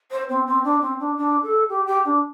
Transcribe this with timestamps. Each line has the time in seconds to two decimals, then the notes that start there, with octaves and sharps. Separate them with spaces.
0.11 C5
0.29 C4
0.47 C4
0.64 D4
0.81 C4
1.00 D4
1.17 D4
1.43 A4
1.69 G4
1.87 G4
2.05 D4